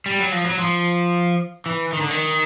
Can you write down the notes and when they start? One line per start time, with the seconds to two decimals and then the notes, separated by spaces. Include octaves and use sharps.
0.06 G3
0.19 F#3
0.32 F3
0.45 F#3
0.59 F3
1.66 E3
1.93 D#3
2.01 D3
2.10 D#3